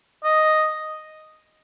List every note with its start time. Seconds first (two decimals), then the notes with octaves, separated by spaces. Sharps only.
0.24 D#5